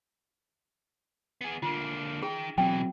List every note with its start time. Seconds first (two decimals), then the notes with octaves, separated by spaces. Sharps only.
1.41 B3 G#4
1.62 D3 A#3 F4
2.23 D#4 G#4 G5
2.58 B2 E3 F#3 C4 G5